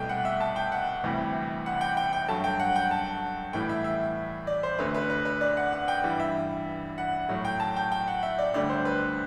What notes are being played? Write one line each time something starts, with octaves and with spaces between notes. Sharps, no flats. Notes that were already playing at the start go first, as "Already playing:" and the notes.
Already playing: C2 B2 A3 G5
F#5
E5
A5
G5
F#5
D2 C3 E3 G3
F#5
G5
G5
G5
G2 F#3 A3 A5
G5
F#5
G5
A5
A2 E3 G3 G5
E5
E5
D5
C5
D2 D3 A3 B4
B4
B4
B4
D5
F#5
F#5
G5
G2 E3 G3
E5
F#5
A2 F#3 A3
G5
A5
G5
G5
F#5
E5
D5
D2 D3 G3 D5
C5
B4